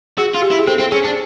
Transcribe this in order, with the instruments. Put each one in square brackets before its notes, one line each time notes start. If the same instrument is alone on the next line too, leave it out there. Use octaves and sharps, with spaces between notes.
[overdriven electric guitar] F#4 [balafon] G#4
[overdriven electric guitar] F4
[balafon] G4
[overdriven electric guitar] E4
[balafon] G#4
[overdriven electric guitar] C4 [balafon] A4
[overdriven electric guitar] C4
[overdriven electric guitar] C#4 [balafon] G#4
[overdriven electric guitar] D4